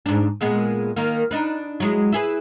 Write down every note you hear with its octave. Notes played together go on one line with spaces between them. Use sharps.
G#2 D4
A#2 G#3 B3
D#3 A#3
D4 D#4 B4
F#3 G#3 E4
E4 G#4 B4